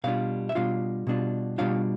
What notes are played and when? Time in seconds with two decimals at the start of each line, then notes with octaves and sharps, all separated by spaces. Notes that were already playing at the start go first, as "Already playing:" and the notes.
0.04 B2 G3 D4 F4 F5
0.49 E5
0.55 B2 G3 D4 F4 F5
1.07 B2 G3 D4 F4
1.58 B2 G3 D4 F4 F5